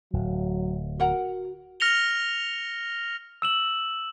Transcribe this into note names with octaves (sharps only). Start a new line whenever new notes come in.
D1 F#3
F#4 A#4 F#5 A#5
F6 A#6 C#7 F7 G7
E6 E7 F#7